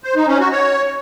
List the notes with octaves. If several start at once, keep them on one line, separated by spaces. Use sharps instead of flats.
C5
D#4
C#4
F#4
C#5